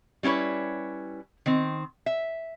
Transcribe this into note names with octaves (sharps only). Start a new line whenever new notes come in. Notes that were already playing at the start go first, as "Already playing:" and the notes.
G3 C#4 E4 B4 C#5
D#3 C4
E5